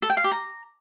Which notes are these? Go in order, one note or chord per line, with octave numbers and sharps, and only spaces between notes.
A4
G5
F5
G4
A#5